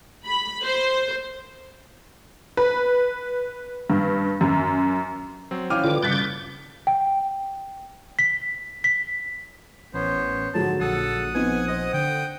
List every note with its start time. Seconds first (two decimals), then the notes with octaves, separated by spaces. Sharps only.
0.24 B5
0.64 C5
2.57 B4
3.90 G2
4.41 F#2
5.51 F#3 C4
5.70 E3 C#4 F5 G5 D6 F6 D#7
5.84 D3 F4 B4 D6
6.03 G2 C#3 D6 F#6 G6 A6 B6 C#7
6.87 G5
8.19 B6
8.84 B6
9.94 A1 B3 C#4 C5
10.54 G#2 D3 F#3 G#4 A5
10.80 A#1 A4 F#5 D#6
11.35 B3 C4 D#4 G#5
11.68 C5 D#5
11.94 D3 G5